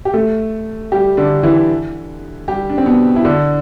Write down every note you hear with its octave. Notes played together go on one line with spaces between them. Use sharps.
G4
A3 A4
G3 G4
D3 D4
E3 E4
G3 G4
D4
C4
B2 B3
E4
D3 D4